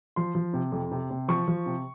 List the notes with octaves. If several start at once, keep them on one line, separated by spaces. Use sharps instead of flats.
F3 C6
F3
C3
F2
C3
C3
F3 C#6
F3
C3